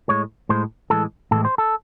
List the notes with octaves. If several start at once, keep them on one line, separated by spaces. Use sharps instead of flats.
A2 G#3 C#5
A2 G#3 C5
A2 E3 G#3 A4
A2 E3 G#3 A4
C5
A4